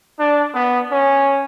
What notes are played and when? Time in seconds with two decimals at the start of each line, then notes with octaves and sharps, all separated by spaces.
0.19 D4
0.54 B3
0.91 C#4